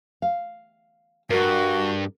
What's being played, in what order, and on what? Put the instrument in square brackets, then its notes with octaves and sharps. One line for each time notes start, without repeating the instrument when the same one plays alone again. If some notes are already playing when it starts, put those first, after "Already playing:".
[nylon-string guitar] F5
[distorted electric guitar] G2 [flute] F#4 [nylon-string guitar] A#4